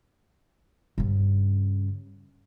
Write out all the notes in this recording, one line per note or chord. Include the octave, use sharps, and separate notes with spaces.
G2 C#3